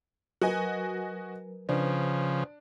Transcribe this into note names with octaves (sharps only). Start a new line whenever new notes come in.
F#3 F#4 A#4 B4 D#5 G#5
C#3 F3 D4 B4 C5